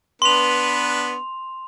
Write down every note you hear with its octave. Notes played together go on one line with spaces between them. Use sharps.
B3 D4 B4 C6 F7